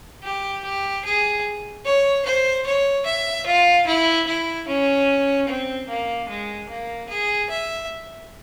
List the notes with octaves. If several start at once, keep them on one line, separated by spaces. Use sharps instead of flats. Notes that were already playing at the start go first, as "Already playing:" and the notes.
G4
G4
G#4
C#5
C5
C#5
E5
F4
E4
E4
C#4
C4
A#3
G#3
A#3
G#4
E5